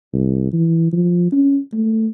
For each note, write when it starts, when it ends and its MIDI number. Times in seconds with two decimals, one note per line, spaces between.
0.13 0.50 36
0.53 0.90 52
0.93 1.30 53
1.32 1.58 61
1.73 2.07 57